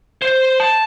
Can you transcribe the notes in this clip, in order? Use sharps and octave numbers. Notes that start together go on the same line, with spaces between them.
C5
A5